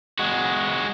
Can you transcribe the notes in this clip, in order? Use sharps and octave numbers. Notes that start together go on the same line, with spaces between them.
G#3 F#4